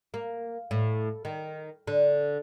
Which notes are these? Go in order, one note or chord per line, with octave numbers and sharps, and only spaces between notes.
A#3
A2
D#3
D3